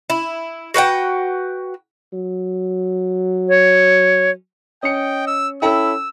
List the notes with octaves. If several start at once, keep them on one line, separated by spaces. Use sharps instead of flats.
E4
F#4 B4 F#5 G5
F#3
C#5
C#4 D#5 G5 C#7
E6
C#4 E4 A4 G5 E6